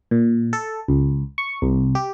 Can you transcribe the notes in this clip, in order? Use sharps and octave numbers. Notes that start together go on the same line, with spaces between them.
A#2
A4
C#2
C#6
C2
G4